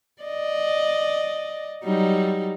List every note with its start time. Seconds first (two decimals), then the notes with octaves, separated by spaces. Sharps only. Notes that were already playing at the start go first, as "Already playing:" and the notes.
0.22 D5 D#5
1.84 F#3 G3 D#4